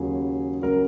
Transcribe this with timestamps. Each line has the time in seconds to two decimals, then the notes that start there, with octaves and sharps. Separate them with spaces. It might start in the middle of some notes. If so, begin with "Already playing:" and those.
Already playing: D#2 C#3 F#3 G#4
0.62 C#3 F#3 A#4